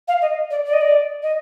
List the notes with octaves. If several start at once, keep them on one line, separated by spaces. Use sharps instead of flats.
F5
D#5
D5
D5
D#5
D5
D#5